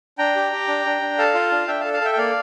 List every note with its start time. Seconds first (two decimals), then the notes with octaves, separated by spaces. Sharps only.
0.18 D4 G5 A#5
0.36 G4
0.52 G4
0.68 D4
0.85 D4
1.01 D4
1.18 A4 F5 A5
1.34 F4
1.51 D4
1.67 D4 E5 G5
1.80 A4 F5 A5
1.93 F5 A5
2.01 A4 E5 G5
2.13 G5
2.17 A#3 D5 F5